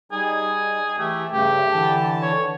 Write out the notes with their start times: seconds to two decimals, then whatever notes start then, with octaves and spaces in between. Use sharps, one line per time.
0.12 G3 D#4 G#4
0.99 E3 A3 G4
1.31 G2 C#3 A3 G4
1.72 D3 E3 A5
2.22 C#5